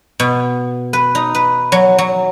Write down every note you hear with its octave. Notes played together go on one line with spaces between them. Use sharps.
B2
B4
D#4
B4
F#3
F#3